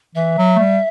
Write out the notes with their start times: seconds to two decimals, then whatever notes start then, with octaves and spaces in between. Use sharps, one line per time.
0.15 E3 E5
0.38 F#3
0.56 A3
0.59 G3